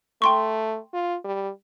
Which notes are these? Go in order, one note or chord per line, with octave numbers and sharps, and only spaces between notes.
A3 G5 C6 C#6
F4
G3